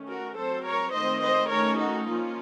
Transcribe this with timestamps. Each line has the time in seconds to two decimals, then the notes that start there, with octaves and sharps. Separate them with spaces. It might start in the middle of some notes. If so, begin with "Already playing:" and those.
Already playing: D#3 A3 C#4
0.09 F#4 A#4
0.37 F#3 C4 A4 C5
0.65 A#4 C#5
0.94 D#3 A3 C4 C5 D#5
1.23 C5 D#5
1.51 D#3 A3 C#4 A#4 C#5
1.80 D#4 F#4
2.08 F3 A#3 C#4 F4